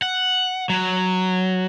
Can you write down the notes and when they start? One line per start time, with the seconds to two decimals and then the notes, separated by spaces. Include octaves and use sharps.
0.02 F#5
0.70 F#3